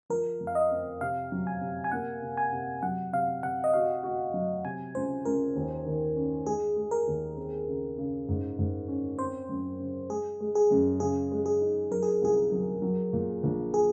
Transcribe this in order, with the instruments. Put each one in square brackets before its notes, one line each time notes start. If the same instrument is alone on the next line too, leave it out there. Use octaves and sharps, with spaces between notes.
[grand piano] F3 [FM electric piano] A#4
[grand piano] F2
[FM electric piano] F5
D#5
[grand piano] C4
[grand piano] C3 [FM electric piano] F5
[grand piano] F#3
[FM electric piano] G#5
[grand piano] C3
[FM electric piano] G#5
[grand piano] A#3 [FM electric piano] F#5
[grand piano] C3
[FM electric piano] G#5
[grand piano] C3
[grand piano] F#3 [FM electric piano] F#5
[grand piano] C3 [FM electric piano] F5
[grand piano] C3 [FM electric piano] F#5
[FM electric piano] D#5
[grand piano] F#4 [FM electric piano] F5
[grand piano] F#4
F#3
[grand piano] C3 [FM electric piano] G#5
[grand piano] C#2 [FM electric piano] C5
[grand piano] C#2 [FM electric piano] A#4
[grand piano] D#2
D#3
C#4
[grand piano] G#3 [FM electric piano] G#4
[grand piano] G#3
[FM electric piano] A#4
[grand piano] D#2
C4
C#3
C#3
G#2
G#2
C#4
[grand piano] C4 [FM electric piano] C5
[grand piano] F#2
C#3
[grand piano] G#3 [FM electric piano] G#4
[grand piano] G#3
[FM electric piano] G#4
[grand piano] F#2
[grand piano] C#3 [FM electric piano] G#4
[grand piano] G#3
[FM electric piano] G#4
[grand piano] D#4
[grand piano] F#3 [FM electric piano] A#4
[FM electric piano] G#4
[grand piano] C2 [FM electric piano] G#4
[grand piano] F#3
F#3
A#2
A#1
[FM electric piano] G#4